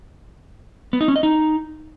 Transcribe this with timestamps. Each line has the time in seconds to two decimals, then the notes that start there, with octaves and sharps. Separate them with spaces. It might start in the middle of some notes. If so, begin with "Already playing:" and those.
0.93 B3
1.01 D#4
1.08 C#4
1.16 D#5
1.23 D#4